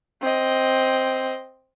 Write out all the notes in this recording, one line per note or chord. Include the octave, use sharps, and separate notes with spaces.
C4 D#5